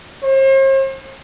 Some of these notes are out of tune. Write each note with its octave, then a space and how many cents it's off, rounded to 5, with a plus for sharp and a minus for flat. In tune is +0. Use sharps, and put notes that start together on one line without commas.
C5 +45